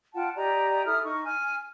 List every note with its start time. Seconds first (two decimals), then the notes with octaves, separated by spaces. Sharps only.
0.14 F4 F#5 G5 A5
0.37 G4 D5 D#5 A#5
0.86 E4 A4 D#6 F6
1.04 D#4 C#6
1.24 G#5 F6